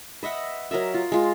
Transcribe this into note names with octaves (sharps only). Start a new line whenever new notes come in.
B4 D#5 E5 F#5
F#3 A#4 D#5 E5
F4
G#3 F4